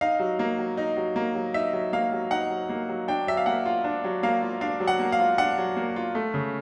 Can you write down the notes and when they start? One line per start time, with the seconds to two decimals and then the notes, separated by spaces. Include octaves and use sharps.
0.01 D#4 F5
0.19 F#3
0.39 A#3
0.59 F#3
0.77 D#4
0.97 F#3
1.16 A#3
1.35 F#3
1.54 D#4 E5
1.73 F#3
1.93 A#3 F5
2.12 F#3
2.31 D#4 F#5
2.50 F#3
2.69 A#3
2.89 F#3
3.08 D4 G5
3.27 F#3 E5
3.37 F5
3.46 A#3 F#5
3.66 F4
3.84 D4
4.04 F#3
4.23 A#3 F5
4.42 F4
4.61 D4 F5
4.80 F#3
4.88 F#5
4.99 A#3
5.12 F5
5.20 F4
5.38 D4 F#5
5.58 F#3
5.76 A#3
5.96 F4
6.15 A3
6.34 C#3